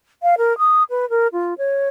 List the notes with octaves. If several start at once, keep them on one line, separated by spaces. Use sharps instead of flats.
F5
A#4
D#6
B4
A#4
F4
C#5